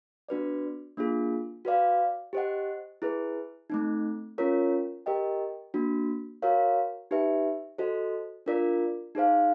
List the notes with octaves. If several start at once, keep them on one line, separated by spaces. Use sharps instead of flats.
B3 D4 F#4 B4 D5
A#3 D4 F4 G#4
F#4 B4 D5 F5
G4 C5 D#5 F#5
E4 G#4 B4
A3 C4 D#4
C#4 F4 A#4 C#5
G4 A#4 D#5 G5
A#3 D4 F#4
F#4 A#4 C#5 F5
D#4 G4 B4 E5
F#4 A4 C5 D#5
D4 F4 A#4 D5
D#4 G#4 C5 F5